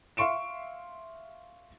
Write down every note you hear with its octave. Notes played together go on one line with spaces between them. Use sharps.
E5 F5 C6 C#6 D7 E7